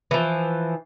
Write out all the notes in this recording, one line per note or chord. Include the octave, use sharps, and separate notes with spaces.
E3 F3